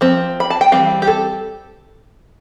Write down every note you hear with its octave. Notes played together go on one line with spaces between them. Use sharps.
F3 C4
B5
A5
G5
E3 G3 C4 F5
G4
A4